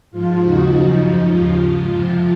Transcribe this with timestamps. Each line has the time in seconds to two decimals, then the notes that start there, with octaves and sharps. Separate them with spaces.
0.11 G#2 F3 F4
0.41 D#2 C#3 F3 D#4 F#4
0.70 F#2 C#3 F3 D#4
0.99 G#2 F3
1.29 D#2 C#3 F3 F4
1.59 G#2 F3
1.88 F2 C3 F3